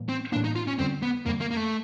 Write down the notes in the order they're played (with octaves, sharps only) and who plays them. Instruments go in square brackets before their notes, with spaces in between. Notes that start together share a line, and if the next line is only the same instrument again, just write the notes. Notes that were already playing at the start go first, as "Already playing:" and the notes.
Already playing: [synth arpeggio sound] A2 E3 G3 A#3
[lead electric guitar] C4
[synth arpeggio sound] A2 E3 G3 A#3 [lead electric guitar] D4
[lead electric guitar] D#4
F4
C#4
[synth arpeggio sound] F2 D3 G3 [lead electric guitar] C4
[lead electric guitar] B3
[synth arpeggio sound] F2 D3 G3 [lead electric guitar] A#3
[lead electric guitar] A#3
A#3
A3